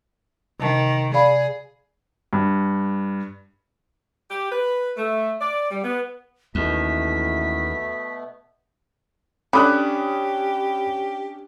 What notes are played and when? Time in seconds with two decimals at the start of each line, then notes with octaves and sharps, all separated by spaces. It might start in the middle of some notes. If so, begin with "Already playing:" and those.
0.60 C3 D#3 A5
1.14 G#4 D5 F5 B5
2.33 G2
4.29 G4
4.50 B4
4.97 A3
5.40 D5
5.70 G3
5.83 B3
6.55 A1 D#2 B2 A3 B3 B6
9.53 D3 C#4 D4 G4 B5 D#6 F#6